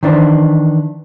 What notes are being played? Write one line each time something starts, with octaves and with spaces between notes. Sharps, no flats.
D#3 E3 D4 D#4 C5